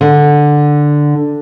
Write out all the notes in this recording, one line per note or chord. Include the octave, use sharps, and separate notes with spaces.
D3